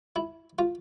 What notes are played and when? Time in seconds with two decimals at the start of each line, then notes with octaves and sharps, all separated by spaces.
0.16 E4
0.59 F4